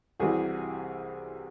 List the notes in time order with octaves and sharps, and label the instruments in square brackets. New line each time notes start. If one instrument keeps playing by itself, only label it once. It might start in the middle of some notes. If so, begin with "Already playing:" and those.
[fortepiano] C2 C3 E3 G3 F#4 G#4